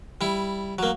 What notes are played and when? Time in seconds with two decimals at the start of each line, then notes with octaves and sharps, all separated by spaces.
0.21 G3 E4
0.79 F#3 A#3